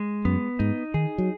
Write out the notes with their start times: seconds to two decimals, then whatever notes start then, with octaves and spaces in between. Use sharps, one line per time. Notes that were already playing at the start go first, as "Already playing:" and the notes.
Already playing: G#3
0.25 F#2 B3
0.59 G#2 D#4
0.94 D#3 G#4
1.18 F#3